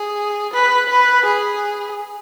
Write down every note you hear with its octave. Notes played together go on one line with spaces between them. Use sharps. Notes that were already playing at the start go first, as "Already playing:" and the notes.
Already playing: G#4
B4
B4
G#4